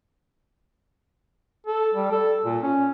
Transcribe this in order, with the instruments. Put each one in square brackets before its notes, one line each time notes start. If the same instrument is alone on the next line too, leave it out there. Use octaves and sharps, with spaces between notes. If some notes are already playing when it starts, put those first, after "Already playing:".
[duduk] A4
G3
A4
A#2
C#4